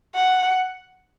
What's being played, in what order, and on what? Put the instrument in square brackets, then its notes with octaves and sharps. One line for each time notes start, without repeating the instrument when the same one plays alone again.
[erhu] F#5